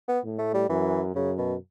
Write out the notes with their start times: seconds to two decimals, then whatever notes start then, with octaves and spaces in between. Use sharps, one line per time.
0.09 B3
0.24 A2
0.38 A3
0.54 G3
0.69 F#2 E3
1.15 F#2 C#3
1.38 B2